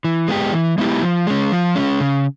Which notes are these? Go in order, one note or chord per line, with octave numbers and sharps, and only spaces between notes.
E3
G#3 B3 E4 G4
E3
G#3 B3 E4 G4
F3
G#3 C#4
F3
G#3 C#4
C#3